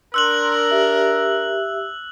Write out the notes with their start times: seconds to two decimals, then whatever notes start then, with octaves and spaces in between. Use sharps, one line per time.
0.14 D4 A#4 C6 E6 F#6 F#7
0.71 G4 E5